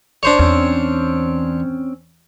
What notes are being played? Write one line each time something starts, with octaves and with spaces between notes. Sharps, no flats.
D4 C5 C#5
E2 C4 C#4